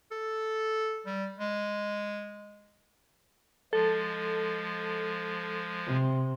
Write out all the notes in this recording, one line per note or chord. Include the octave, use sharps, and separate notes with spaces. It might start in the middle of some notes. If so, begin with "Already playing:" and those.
A4
G3
G#3
F3 G#3 A4
C3